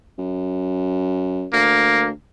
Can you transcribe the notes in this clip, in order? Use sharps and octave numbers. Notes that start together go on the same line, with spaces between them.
F#2
D2 A#3